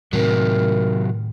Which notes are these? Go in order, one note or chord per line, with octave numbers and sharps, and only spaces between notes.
A2 C3 D#3 F#3 A#4